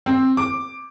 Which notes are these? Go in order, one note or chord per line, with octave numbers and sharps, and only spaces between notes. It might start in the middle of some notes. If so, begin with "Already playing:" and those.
C4
D6